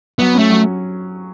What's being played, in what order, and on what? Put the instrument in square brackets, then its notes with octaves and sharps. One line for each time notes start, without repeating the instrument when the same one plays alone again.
[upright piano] F#3 [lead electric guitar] B3
[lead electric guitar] A3 [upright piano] C#4
[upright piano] F#3